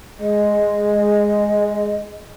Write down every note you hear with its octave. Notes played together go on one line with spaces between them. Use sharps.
G#3 D#5